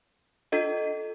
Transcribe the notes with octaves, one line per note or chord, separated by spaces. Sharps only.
D4 F4 A4 D#5